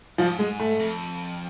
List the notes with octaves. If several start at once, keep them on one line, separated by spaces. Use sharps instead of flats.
G#2 F3
G#3
A3
F2